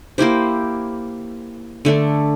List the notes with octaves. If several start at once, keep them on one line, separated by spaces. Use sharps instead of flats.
A#3 E4 G4 C5
D3 A3 D4